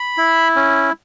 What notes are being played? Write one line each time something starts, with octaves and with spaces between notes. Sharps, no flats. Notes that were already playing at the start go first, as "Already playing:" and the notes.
Already playing: B5
E4
C#4